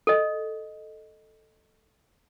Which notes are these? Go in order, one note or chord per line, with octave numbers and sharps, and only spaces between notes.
A4 D#5